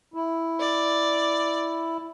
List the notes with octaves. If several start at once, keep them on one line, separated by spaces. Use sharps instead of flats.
E4
D5